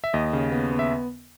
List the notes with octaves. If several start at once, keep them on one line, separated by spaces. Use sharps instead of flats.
E5
D#2 D#5
C#3
B3
B3
E5